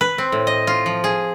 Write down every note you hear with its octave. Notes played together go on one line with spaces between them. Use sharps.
B4
C4
A2
D#5
F4
F3
G#4